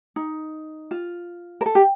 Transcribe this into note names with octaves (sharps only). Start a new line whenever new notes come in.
D#4
F4
A#4
A4
G4